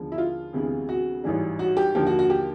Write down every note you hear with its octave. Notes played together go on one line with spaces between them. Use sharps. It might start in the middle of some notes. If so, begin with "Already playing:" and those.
Already playing: D#2 D3 F3 G#3 B3
E4
F4
D2 C3 E3 G#3 B3
F#4
A1 G#2 E3 G3
F#4
G4
D#2 D3 F3 A#3 G4
F#4
F#4
G4